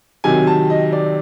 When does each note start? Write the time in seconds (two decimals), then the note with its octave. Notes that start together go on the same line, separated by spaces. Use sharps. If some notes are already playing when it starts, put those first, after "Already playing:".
0.24 C3 D#3 F#3 G#5
0.47 A5
0.70 D#5
0.93 D5